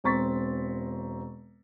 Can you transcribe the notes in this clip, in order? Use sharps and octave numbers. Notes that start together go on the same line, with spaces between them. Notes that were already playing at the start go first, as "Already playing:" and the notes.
E1 C4 A#5 C#6 A6 B6